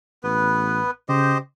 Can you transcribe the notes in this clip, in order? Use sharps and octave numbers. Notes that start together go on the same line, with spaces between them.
A1 B3 B4
C#3 G4 C5 D#5